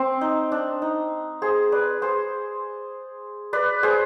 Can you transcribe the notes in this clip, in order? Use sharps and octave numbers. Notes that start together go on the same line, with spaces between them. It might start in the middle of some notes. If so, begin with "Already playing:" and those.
Already playing: C4
D#4
D4
D#4
G#4 C5
B4 D5
G#4 C5
B4 D5
G#4 C5